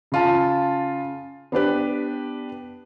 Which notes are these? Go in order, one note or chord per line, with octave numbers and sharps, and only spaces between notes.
C#3 F4 A5
B3 D4 G4 B4